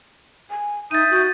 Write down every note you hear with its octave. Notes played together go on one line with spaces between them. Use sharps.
G#5
D#4 E5 D#6 G6 A6 D#7
F#4